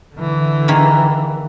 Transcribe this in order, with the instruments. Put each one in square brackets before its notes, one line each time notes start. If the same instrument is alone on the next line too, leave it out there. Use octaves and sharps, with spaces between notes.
[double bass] D3 E3
[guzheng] D#3 A#3 G#4